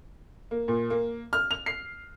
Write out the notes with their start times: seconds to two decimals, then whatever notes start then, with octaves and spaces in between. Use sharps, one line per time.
0.51 A#3
0.68 A#2
0.90 A#3
1.33 F6
1.51 F7
1.66 C7